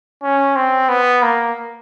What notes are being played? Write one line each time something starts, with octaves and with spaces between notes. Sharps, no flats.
C#4
C4
B3
A#3